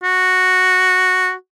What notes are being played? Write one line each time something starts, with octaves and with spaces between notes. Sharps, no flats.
F#4